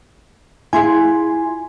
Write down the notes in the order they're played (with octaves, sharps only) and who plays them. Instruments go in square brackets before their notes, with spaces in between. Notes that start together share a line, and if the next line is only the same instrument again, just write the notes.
[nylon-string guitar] E4 F4 G#4 [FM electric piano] G#5 C6